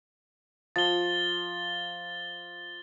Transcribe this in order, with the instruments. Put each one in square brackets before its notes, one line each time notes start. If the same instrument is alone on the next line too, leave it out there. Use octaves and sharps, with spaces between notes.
[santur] F3 [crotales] A6 G7